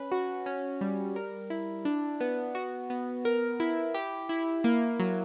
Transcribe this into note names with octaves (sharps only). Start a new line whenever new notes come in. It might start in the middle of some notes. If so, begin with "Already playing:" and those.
Already playing: C#4 B4
F#4
C#4
G3
A#4
E4
D4
B3
F#4
B3
A#4
E4
G4
E4
A#3
F#3